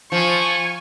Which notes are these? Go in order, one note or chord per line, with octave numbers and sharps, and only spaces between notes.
F3 G#5 C#6